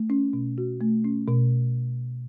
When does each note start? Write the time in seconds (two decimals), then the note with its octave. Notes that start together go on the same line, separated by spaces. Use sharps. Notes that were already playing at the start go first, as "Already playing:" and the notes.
Already playing: A3
0.10 C#4
0.33 B2
0.58 F#4
0.81 A3
1.04 C#4
1.28 B2